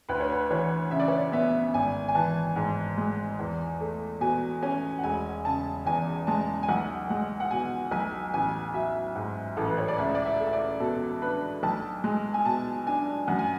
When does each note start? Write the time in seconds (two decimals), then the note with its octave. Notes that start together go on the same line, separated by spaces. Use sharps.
0.09 D2 B4
0.20 C#5
0.32 B4
0.50 E3 C#5
0.91 C#3 E5
1.00 D5
1.08 C#5
1.17 D5
1.32 B3 E5
1.74 G#1 G#5
2.08 G#5
2.15 E3 A5
2.56 G#2
2.97 G#3
3.39 E2
3.81 A3
4.21 B2 G#5
4.63 C#4 G#5
4.98 F#5
5.04 E1 G#5
5.45 C#3 A5
5.86 E2 G#5
6.27 G#3 A5
6.63 G#5
6.68 B1 F#5
7.09 G#3 F#5
7.40 F#5
7.51 B2 G#5
7.91 B1 G#5
8.33 A1 G#5
8.74 F#3 E5
9.15 G#2
9.57 A1 A4
9.67 B4
9.78 C#5
9.88 D5
9.98 C#2 E5
10.15 D5
10.26 E5
10.40 A3
10.47 E5
10.53 D5
10.80 B2 A4
11.21 D4 B4
11.63 B1 A5
12.04 G#3
12.34 G#5
12.45 B2 A5
12.87 D4 G#5
13.27 F#2 F#5
13.39 G#5